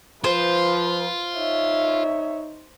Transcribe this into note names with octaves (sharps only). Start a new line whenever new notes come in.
F3 F4 B4 C5
D#4 C#5 E5